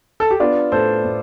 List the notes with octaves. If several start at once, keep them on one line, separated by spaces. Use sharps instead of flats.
A4
G4
B3 D4 F4
A2 A4 C5
A2